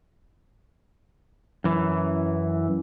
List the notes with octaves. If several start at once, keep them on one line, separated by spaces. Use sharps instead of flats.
F#2 E3